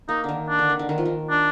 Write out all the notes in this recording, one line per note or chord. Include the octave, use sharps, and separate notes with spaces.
A#3 D#4
D3 D#3
D4
D3
D#3
D3
D#3
F3
D#3
D4